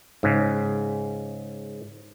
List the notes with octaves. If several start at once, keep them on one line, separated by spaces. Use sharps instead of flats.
G#2 C#3